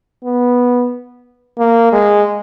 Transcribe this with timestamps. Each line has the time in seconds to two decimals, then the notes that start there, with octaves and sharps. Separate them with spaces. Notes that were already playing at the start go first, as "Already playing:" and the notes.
0.24 B3
1.58 A#3
1.92 G#3